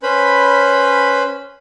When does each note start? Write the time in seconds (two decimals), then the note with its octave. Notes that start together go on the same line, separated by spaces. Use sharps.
0.03 C#4 B4 C5 B5